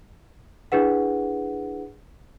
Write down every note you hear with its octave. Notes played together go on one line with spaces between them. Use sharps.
D4 E4 G#4 B4 F#5